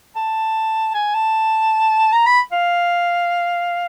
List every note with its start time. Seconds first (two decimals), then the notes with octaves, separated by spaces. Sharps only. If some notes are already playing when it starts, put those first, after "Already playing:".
0.16 A5
0.94 G#5
1.14 A5
2.13 A#5
2.26 B5
2.52 F5